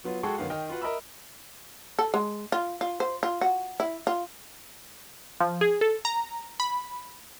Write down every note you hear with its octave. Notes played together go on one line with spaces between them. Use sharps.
F#3 B3 F4
G#3 F#4 G#4 A4 G5 C#6
F#2 D#3 B3 F5 F#5
D#3 D#5 G5 F6
F4 F#4 B4 F#5
A#4 D#5 E5 B5 E6
A4
G#3
F4
F4
C5
F4
F#4
E4
F4
F3
G#4
A4
A#5
B5